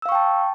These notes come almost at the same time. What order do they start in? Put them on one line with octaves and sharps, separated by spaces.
E6 F5 C#6 G5 A5